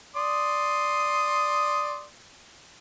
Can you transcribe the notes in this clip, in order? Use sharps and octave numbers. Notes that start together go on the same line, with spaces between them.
D5 C6 D#6